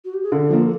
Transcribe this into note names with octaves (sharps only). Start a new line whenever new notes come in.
F#4
G4
G#4
D3 A4
F3 A#3